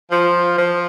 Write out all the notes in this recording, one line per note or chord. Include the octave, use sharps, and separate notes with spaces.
F3
F3